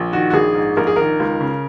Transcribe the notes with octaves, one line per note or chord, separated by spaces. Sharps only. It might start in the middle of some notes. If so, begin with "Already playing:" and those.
Already playing: A#1
D#3 F#4
F#4
A#1 G#4
G#2
A#1 A#4
G#4
D#3 A#4
C#2
C#3